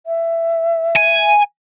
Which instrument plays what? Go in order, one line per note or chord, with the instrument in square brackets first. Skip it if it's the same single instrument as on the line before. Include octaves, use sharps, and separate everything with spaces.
[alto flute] E5
[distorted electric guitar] G#5